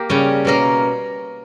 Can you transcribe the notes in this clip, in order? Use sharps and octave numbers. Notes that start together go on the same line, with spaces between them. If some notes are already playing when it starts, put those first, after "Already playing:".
Already playing: A#3 G4 A#4
C#3 G3 C#4
B2 A#3 C#4 A#4